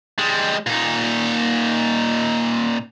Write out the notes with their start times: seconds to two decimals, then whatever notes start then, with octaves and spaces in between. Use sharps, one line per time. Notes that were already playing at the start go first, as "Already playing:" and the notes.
0.18 G3 G#3
0.66 A#2 D#4